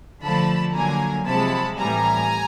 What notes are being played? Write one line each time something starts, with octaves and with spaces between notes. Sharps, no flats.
D3 F3 A3 A5 B5
D3 F#3 A#3 G#5 A#5
C3 F3 G#3 A5 B5
A2 E3 G3 G#5 A#5